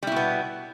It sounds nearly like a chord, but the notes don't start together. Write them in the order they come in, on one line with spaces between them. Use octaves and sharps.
G3 E4 B2 B3